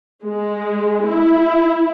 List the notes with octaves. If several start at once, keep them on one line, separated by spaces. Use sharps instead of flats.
G#3
E4